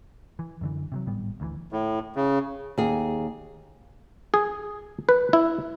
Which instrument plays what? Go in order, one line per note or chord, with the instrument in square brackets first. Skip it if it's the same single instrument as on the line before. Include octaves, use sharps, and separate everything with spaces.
[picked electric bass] E3
F#2 D3 E3
C3 F3 F#3
G#1 A2 G3 B3
D2 C#3 E3
[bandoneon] A2
C#3
[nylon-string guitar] D#2 G#4
[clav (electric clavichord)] G#4
B4
E4